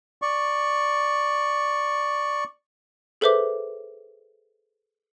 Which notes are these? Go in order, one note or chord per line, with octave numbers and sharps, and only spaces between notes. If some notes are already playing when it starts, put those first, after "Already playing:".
D5 C#6
G#4 A4 B4 C5 E5 D6